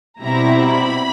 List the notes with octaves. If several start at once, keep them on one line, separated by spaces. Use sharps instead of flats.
B2 G3 C4 E4 A#5
B5